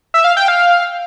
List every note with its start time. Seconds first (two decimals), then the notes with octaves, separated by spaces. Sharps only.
0.14 E5
0.24 F5
0.37 G5
0.48 F5